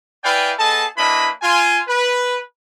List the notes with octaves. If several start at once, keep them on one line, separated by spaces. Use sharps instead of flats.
E4 B4 D5 F5 G5 G#5
B3 G#4 A4 D#5 A5
A#3 D4 E4 B4 D#5 B5
F4 G#5
B4